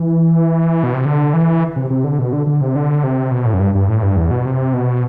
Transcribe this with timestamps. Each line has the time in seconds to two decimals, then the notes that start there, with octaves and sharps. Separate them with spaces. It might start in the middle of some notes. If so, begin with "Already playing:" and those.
Already playing: E3
0.83 B2
0.94 C3
1.06 D3
1.34 E3
1.76 C3
1.90 C3
2.04 D3
2.19 B2
2.33 D3
2.47 D3
2.61 C3
2.76 D3
3.04 C3
3.31 B2
3.46 A2
3.53 F#2
3.60 G2
3.75 G2
3.89 A2
4.03 G2
4.16 E2
4.31 B2
4.46 C3
4.73 B2